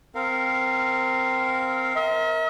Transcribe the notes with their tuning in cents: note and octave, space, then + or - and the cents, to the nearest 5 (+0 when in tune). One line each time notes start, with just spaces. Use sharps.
C4 -15 A#4 -20 F5 +0
A#4 +0 E5 -45